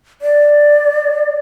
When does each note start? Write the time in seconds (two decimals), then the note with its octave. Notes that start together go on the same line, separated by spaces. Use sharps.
0.22 D5